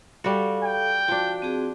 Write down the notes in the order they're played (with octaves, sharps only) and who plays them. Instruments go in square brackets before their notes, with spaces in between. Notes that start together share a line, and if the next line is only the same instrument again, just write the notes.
[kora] G3 F#4 [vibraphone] A4 F5
[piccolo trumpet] G5
[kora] F3 D4 [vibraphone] F#4
[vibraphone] C4 F#4 G#4